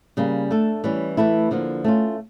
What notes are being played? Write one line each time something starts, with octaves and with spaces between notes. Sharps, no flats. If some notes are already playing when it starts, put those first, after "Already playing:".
C#3 G3 A#3
A3 D4 A4
E3 G3 C#4
E3 A3 E4
D3 F3 A#3
A3 C#4 F4